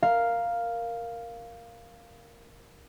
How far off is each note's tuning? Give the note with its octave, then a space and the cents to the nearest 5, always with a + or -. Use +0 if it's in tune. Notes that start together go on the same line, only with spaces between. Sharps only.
A#4 +0 F5 +0